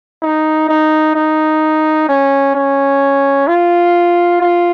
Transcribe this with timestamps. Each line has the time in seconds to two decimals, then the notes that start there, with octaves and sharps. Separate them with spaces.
0.22 D#4
0.68 D#4
1.15 D#4
2.09 C#4
2.55 C#4
3.48 F4
4.41 F4